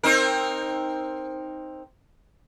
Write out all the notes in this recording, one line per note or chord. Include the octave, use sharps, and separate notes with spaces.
C4 D#4 A#4